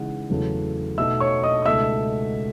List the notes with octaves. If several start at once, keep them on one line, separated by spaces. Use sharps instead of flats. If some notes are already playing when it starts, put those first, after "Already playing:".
Already playing: C#3 E3 G#3 D#4 F#5
E2 C#3 F#3 A3 E4
B2 A3 D#4 E5 E6
C#5 C#6
D#5 D#6
D#6
C#2 B2 A3 D#4 E5 E6